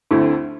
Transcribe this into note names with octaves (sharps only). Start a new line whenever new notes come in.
D2 D3 A3 C4 E4